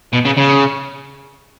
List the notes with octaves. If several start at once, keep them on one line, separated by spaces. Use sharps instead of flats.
B2
C#3
C#3